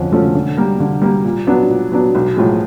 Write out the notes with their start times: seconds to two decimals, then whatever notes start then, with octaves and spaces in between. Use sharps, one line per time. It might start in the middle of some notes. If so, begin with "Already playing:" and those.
Already playing: F2 D3 F3 C#4
0.12 D3 F3 A3 C#4
0.35 D3
0.57 G3 A#3
0.80 D3
1.02 G3 A#3
1.25 A#2
1.47 F#3 B3 D4
1.69 A#2
1.92 F#3 B3 D4
2.15 B1
2.37 A2 F3 G#3